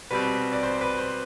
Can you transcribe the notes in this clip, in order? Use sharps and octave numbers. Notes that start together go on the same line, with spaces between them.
B2 G3 C4 B4
D5
C5
B4
C5